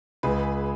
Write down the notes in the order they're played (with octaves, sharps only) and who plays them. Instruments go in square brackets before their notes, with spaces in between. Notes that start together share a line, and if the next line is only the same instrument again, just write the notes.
[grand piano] C#2 [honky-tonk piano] G#4 B4